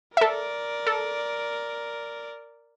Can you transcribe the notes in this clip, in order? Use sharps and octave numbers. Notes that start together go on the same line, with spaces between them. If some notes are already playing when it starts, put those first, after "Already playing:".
A4 A#4 D5 E5
A4